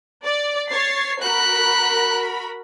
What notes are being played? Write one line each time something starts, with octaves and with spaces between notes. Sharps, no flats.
D5
C#5 A6 C7
F#4 A#4 B5 F#6